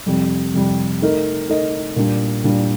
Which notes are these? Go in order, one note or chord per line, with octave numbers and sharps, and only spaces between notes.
F2 C3 G3
F2 C3 G3
A3 D#4 A#4 D#5
A3 D#4 A#4 D#5
A#2 G3 D4
A#2 G3 D4